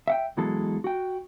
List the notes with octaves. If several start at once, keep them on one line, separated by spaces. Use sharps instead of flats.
E5 F#5 G5
B1 B2 E3 F#3 G#3 A4
F#4 G5